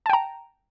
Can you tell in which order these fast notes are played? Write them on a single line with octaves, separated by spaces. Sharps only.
A5 G5 A#5